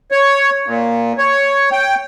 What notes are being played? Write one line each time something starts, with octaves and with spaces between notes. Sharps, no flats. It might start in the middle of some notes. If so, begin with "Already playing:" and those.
C#5
A#2
C#5
G5